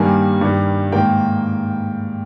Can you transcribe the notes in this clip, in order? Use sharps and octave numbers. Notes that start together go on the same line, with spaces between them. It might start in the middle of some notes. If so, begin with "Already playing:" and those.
Already playing: G2 D#3 G3 A#3 G#5
G2 D#3 G3
G#2 D#3 A#3 G5